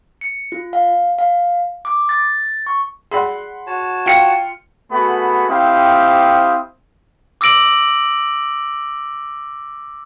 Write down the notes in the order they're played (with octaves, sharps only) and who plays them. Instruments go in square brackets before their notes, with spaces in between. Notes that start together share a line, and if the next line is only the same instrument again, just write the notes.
[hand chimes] C#7
F4
F5
F5
D6
A6
C#6
[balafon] G#4 D5 [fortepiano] F#5 B5 C6
[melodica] F#4 C#5 A5
[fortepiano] F4 [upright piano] G5 C#7
[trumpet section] A3 B3 F#4 G#4 B5
C4 E4 G4 C5 F5 D#6
[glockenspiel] D6 E6 A#6 D7 F#7